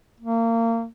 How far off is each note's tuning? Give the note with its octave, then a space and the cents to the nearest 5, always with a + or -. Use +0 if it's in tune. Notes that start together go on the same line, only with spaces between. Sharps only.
A#3 -30